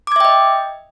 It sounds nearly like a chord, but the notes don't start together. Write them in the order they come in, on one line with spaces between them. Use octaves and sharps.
D6 G#6 E5 G5 D#5